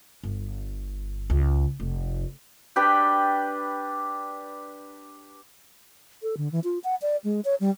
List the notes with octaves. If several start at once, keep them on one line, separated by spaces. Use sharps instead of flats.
G1
C#2
F1
D4 G4 B4 G5
A4
D3
E3
F4
F#5
D5
G#3
C#5
G3